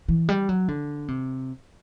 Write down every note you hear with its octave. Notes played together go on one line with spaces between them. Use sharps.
E3
G3
F#3
D3
C3